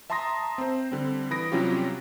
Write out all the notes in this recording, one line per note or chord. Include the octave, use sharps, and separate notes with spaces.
E5 A5 A#5 C6 D#6 A#6
C4 C5
D3 G3 C4
E3 B5 D#6 A#6 D7
C3 F#3 G3 C#4 F4 G4